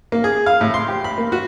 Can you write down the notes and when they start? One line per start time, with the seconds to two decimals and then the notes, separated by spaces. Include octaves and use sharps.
0.12 A#3
0.24 G#4
0.46 F5
0.61 A2
0.74 C6
0.88 G4
1.04 B5
1.18 A#3
1.32 F#4